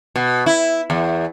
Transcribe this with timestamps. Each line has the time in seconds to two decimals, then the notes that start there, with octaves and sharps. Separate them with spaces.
0.16 B2
0.46 E4
0.90 E2